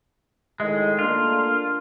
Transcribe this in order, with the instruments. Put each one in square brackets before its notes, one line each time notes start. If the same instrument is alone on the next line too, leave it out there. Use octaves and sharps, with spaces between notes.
[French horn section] A2 D#3 D#5 [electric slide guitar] G#3
[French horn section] A3 A#3 D4 [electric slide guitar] F4